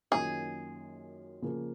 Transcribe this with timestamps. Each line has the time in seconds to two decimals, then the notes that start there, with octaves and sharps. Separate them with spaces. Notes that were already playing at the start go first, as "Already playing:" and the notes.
0.11 F#2 D#3 A#3 C#4 F4 G#4
1.42 C#3 F3 A#3